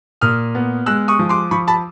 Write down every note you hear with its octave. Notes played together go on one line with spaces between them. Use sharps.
A#2 D#6 F6
B3
G#3 E6 F#6
C#6 D#6
F3
C6 D6
F3 B5 C#6
A5 B5